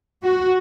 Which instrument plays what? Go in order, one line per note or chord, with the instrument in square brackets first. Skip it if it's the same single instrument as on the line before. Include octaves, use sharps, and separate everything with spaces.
[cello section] F#4